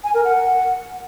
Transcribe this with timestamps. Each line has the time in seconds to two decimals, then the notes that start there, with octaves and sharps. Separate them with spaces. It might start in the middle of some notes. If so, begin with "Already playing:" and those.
0.04 G#5
0.14 A#4
0.25 F#5